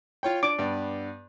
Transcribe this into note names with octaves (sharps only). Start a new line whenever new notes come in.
F4 C#5 G5
D4 D6
G2 B3 D5